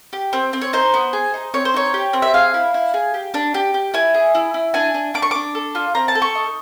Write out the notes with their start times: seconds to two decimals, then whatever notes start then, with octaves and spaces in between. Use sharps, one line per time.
0.13 G4
0.33 C4
0.53 C4
0.62 C#5
0.73 D#4 C5
0.94 B3
1.13 G#4
1.34 D#4
1.54 C4 C#5
1.65 C5
1.74 D#4 C#5
1.94 G4
2.13 C4
2.22 E5
2.34 G#4 F5
2.54 E4
2.74 E4
2.94 G#4
3.14 G4
3.34 D4
3.54 G4
3.74 G4
3.94 E4 G#5
4.14 G#4
4.35 E4
4.54 E4
4.74 D4 G#5
4.94 D4
5.14 D4 D6
5.22 C#6
5.31 D4 D6
5.55 A4
5.75 F4
5.95 C4 A#5
6.08 A5
6.15 A4
6.22 C#6
6.35 D#4